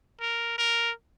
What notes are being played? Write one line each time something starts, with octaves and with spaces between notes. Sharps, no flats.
A#4
A#4